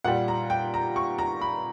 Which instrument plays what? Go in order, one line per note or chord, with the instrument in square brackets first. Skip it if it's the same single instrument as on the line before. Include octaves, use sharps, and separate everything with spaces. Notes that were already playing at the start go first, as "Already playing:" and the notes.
[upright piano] A#2 G3 F#5
A#5
G5
A#5
C#6
A#5
B5